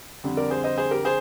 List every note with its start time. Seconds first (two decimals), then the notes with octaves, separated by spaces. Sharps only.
0.23 F2 D3 G3
0.37 A#4 D5
0.50 G#4 C5
0.64 C5 D#5
0.77 G#4 C5
0.91 G4 A#4
1.05 G#4 C5